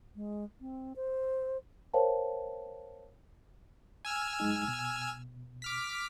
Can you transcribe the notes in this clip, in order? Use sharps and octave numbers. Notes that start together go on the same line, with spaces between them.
G#3
C4
C5
A#4 C5 C#5 F5 G5 A5
G#5 E6 F6
F#2 G#3 D#4
B2
D6 F6 B6